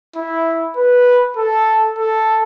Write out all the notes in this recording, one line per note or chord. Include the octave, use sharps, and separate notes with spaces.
E4
B4
A4
A4